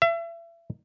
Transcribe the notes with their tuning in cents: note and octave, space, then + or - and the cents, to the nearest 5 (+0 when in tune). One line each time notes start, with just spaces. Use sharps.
E5 +35